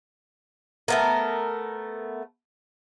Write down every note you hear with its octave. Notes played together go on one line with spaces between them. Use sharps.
A3 B3 A#4